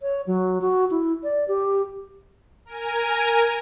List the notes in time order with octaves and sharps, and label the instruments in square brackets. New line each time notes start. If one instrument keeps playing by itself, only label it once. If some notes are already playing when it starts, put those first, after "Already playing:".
[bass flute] C#5
F#3
F#4
E4
D5
G4
[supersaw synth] A#4 G#5